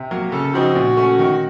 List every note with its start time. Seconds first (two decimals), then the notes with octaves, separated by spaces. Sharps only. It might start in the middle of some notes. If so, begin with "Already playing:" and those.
Already playing: C3
0.11 F#3 A#3
0.32 C#3 A4
0.53 F3 C4 D#4 F#4
0.75 A#2
0.97 A3 C#4
1.19 D#3